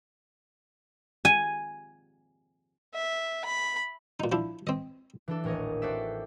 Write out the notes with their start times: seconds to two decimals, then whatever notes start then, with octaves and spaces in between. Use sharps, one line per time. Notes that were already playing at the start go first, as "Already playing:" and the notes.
1.25 G#5
2.94 E5
3.45 B5
4.20 A#2 D#4
4.32 F3 D4 E4
4.67 C4 D#5
5.28 E3 D4 A4
5.44 D#1 A1 A#4 C#5 D#5
5.82 C4 F#4 A4 C5 D5 E5